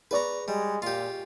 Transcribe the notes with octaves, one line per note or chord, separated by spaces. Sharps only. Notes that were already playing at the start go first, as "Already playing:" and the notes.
G#4 B4 D5 A#5 C#6
G3 G#3
A#2 F4 G4